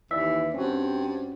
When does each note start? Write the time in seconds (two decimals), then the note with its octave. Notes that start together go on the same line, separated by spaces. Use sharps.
0.11 D#2 E3 D5 E5
0.54 G2 C4 C#4 F#4